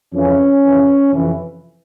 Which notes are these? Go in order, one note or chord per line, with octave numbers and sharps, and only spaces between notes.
F2 C#3 E3 C#4
F2 C#3 E3
F2 C3 E3